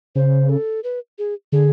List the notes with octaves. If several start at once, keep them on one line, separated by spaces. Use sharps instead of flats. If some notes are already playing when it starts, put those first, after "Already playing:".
C#3 C5
A4
B4
G#4
D3 G#4